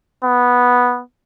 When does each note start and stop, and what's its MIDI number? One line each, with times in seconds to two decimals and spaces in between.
0.24 1.01 59